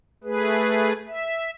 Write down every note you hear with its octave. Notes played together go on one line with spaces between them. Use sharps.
A3 G#4 B4
E5